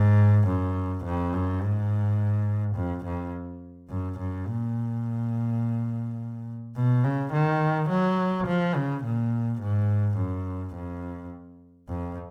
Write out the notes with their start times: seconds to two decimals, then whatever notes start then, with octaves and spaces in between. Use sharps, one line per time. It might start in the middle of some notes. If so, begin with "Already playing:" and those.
Already playing: G#2
0.48 F#2
1.05 F2
1.34 F#2
1.62 G#2
2.76 F2
3.05 F2
3.90 F#2
4.19 F#2
4.47 A#2
6.76 B2
7.04 C#3
7.33 D#3
7.89 F#3
8.47 F3
8.76 C#3
9.04 A#2
9.61 G#2
10.18 F#2
10.75 F2
11.89 F2